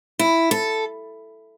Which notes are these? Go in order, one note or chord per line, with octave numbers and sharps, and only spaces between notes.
E4
A4